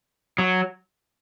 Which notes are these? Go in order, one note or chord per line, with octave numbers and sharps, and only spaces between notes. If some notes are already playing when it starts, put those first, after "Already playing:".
F#3